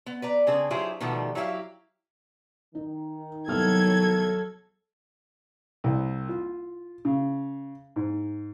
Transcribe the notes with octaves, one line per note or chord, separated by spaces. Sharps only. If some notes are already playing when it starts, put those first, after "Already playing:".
B3
B4 D5 A#5
C#3 C4 D4 G#4
F#3 E4 F4 G4 G#4 C5
B2 D#3 F3 G3 A3 B3
F#3 E4 G4 A4 F5
D#3 D#4
C2 F#3 B3 A4 F6 G#6
C2
F4
C#3
G#2